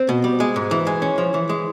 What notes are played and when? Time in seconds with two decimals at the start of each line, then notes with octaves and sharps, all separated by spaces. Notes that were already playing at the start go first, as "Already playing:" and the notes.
Already playing: C4
0.09 B2
0.24 G3
0.40 G#3
0.56 G#2
0.71 E3
0.87 G#3
1.02 C#4
1.18 F3
1.34 E3
1.50 G#3